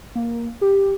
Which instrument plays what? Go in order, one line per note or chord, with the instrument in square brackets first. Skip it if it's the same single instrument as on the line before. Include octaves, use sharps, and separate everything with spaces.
[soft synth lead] A#3
G4